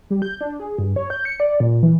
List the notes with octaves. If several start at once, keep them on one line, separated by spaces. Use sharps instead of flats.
G3
G6
D4
G#4
G2
C#5
G6
C#7
D5
A#2
E3